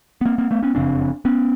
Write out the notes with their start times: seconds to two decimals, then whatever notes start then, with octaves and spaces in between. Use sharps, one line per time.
0.21 B3
0.25 A#3 C4
0.38 A#3 C4
0.51 A3 B3
0.63 B3 C#4
0.75 F#1 F2 C#3 C4 D4
1.25 B3 C#4